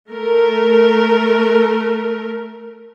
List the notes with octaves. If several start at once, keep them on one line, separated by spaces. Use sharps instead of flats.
A3 A#4